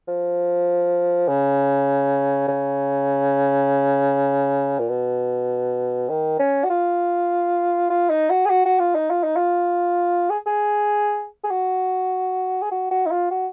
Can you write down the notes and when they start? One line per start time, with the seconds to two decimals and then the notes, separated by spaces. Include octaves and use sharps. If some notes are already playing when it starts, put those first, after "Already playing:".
0.08 F3
1.28 C#3
2.48 C#3
4.79 A#2
4.89 B2
6.09 D#3
6.39 C#4
6.64 F#4
6.70 F4
7.90 F4
8.10 D#4
8.30 F#4
8.46 G#4
8.50 F#4
8.65 F#4
8.79 F4
8.95 D#4
9.10 F4
9.24 D#4
9.36 F4
10.30 G#4
10.46 G#4
11.44 G#4
11.51 F#4
12.62 G#4
12.71 F#4
12.91 F#4
13.06 D#4
13.11 F4
13.31 F#4